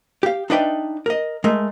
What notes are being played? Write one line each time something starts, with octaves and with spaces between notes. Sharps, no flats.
G4 F5
D4 D#4 B4 D5 E5 G5
A#4 D#5
G#3 A3 A#4